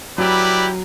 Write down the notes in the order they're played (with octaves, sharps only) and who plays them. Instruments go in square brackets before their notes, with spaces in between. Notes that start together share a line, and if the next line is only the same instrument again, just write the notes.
[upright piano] F#3 [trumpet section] E4 G4 B4 D5